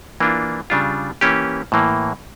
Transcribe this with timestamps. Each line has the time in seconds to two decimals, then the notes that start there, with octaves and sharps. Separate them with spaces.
0.20 E3 A#3 D4 F4
0.70 C#3 G3 D4 F4
1.21 E3 A#3 C#4 G4
1.72 A2 E3 A#3